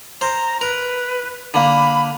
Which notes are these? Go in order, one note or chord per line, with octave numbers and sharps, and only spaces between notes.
C5 A#5
A#4 B4
D3 A#3 B5